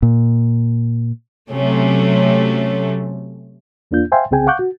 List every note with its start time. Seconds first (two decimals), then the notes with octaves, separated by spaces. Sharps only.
0.02 A#2
1.50 C3 F#3 A3 C#4
3.91 E2 A#3 D4 F4 G6
4.12 C5 E5 F5 G5 G#5 C6
4.31 C2 C#3 C4 G#4 G5 G#5
4.47 F5 F#5 C#6 D6 F#6 G6
4.59 F#4